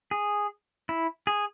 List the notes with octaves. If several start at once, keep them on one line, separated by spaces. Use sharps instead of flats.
G#4
E4
G#4